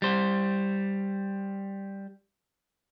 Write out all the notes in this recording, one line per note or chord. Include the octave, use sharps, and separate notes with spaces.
G3 C5